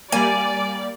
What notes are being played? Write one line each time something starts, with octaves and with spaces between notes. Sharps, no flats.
G3 A#3 D5 G#5